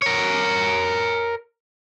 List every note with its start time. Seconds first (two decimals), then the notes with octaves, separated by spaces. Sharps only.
0.02 A#4 C#5